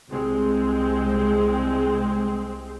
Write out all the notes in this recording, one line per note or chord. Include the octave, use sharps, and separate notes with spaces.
C2 G#3 C4